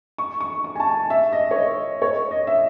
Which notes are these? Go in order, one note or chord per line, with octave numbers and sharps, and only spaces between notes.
C#6
C#6
C#6
G#5
A5
E5
D#5
C#5
D#5
C#5
D#5
E5